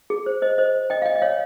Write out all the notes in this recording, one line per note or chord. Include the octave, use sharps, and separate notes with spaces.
G#4
C5
C5 D#5
C5 D#5
D#5 G5
F5
D#5 G5
D#5
C#5 F5